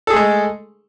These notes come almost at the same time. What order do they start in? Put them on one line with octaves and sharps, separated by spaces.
A4 G#4 A3 G#3